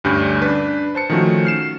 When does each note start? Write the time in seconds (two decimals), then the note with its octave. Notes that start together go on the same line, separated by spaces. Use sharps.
0.04 D2 G2 G3 C#4 G6
0.41 D4 B4
0.95 C5 A5 C#7
1.10 D#3 F3 A3 C#4 F#4
1.45 F6 C7 E7